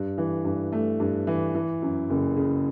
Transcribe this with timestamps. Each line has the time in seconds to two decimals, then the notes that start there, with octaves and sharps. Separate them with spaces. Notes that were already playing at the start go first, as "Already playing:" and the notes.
Already playing: G2
0.18 E3
0.45 G2
0.72 A3
1.00 G2
1.27 E3
1.55 E3
1.82 F#2
2.10 F#1
2.37 C#3